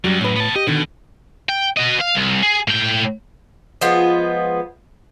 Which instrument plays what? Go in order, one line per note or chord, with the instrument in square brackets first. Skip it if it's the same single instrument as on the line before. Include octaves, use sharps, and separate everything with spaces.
[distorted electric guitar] F#2 [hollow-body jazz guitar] F#3 G3 G4
[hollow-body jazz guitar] A2 B4
[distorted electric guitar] B3 A5
[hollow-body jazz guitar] G4 [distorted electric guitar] D#5
[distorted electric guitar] B2 [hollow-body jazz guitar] D3 D#3
[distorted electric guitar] G5
F#4 D#5
F5
C2
G#4
A2 G5
[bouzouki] F3 G#3 B3 F4